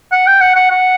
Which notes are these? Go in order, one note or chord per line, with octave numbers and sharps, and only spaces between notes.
F#5
G5
F#5
F#5
F#5